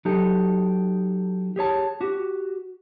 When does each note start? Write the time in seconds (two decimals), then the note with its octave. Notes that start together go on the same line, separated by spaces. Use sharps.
0.05 F#3 D#4 G4 A4
1.56 G4 G#4 C#5 A5
2.01 F#4 G4